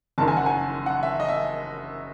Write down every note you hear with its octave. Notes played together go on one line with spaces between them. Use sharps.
F#1 F#2 D#3 A5
G#5
F#5
G#5
F#5
E5
D#5
E5